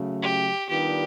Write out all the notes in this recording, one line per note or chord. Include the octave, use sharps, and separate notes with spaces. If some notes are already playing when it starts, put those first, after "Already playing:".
Already playing: C#3 F#3 A3
G4
D#3 G3 B3 D4 F4 G4